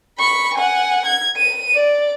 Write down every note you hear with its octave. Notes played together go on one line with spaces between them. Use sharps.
B5 C#6
F#5 G#5
G#6
D#7
D5